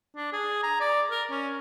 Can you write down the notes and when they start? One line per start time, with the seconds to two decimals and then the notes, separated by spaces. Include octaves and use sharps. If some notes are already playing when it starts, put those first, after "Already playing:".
0.16 D4
0.33 G#4
0.63 A#5
0.80 D5
1.11 A#4
1.31 C#4